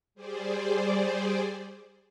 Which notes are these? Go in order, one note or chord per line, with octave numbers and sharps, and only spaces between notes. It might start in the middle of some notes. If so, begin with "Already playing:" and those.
G3 G#4 C5 D5